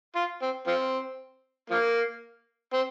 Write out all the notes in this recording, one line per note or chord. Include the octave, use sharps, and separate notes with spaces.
F4
C4
F3 C4
F3 A#3
C4